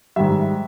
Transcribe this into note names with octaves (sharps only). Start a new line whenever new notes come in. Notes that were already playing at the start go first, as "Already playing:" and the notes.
G#2 D#3 G3 E5